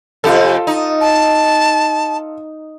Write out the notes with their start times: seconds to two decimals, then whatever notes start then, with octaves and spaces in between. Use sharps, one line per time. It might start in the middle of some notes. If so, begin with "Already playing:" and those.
0.24 F2 C3 F4 G4 A4
0.67 D#4
1.01 A5